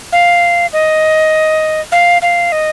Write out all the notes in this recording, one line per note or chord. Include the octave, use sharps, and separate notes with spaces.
F5
D#5
F5
F5
D#5